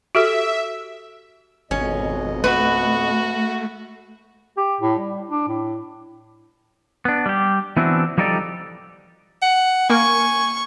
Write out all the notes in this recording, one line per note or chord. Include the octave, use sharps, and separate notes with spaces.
F#4 G4 A4 E5
G#1 F2 B2 C#4 D#5
A3 F#4 B4
G4
A2
G3
D4
A2
B3 D4
G3 G4
E3 B3 C4 D4 E4 F#4
F3 G3 D#4 G4 A4 D5
F#5
A#3 A#4 G#5 C#6